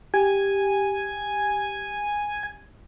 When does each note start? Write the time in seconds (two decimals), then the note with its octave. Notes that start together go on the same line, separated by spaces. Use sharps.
0.14 G4 G#5